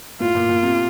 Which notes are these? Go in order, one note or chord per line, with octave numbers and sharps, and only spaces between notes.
A2 F4
A#2
A#2
C3